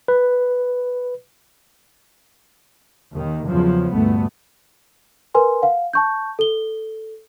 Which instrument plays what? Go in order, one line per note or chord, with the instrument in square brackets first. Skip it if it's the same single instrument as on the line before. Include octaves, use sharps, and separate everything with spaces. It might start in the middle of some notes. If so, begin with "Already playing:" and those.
[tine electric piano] B4
[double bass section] D#2 D#3
E2 C#3 F3 F#3
G1 D2 A#2 A3 B3
[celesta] A#4 B4 G#5 C6
F5 F#5
A5 C#6 G6
A4 G7